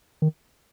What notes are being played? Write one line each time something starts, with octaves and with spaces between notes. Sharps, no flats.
D#3